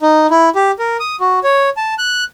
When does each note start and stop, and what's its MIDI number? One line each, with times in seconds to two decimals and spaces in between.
0.01 0.27 63
0.30 0.49 64
0.55 0.71 67
0.79 0.97 70
1.00 1.16 87
1.20 1.39 66
1.44 1.69 73
1.77 1.94 81
1.99 2.24 90